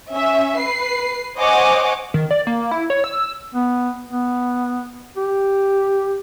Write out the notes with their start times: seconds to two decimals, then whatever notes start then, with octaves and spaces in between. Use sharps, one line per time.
0.12 C#4 E5
0.58 B4 C7
1.38 C5 C#5 D#5 F#5 G#5 D6
2.14 D#3
2.31 D5
2.47 A#3
2.71 E4
2.90 C#5
3.04 E6
3.55 B3
4.09 B3
5.17 G4